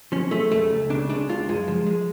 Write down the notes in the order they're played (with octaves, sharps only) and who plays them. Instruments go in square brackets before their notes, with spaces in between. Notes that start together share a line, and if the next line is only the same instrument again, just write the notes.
[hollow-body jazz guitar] F3 C#4
G#3 A3
F2 A3
C#2
C#3 D4
G#3 D4
C#2 F4
F#2 G#3
F3
G#3